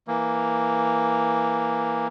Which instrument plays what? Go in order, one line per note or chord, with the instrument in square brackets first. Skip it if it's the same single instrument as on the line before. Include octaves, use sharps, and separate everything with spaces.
[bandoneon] E3 A#3